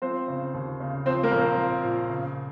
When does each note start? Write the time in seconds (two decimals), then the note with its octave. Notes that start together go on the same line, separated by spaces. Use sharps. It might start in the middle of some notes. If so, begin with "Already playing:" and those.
0.02 F3 C4 C5
0.28 C#3
0.54 D#2
0.80 C#3
1.06 F3 C4 C5
1.23 A#3 A#4
1.32 A#1
1.41 C4 C5
1.57 F3
1.83 A#2
2.10 C#3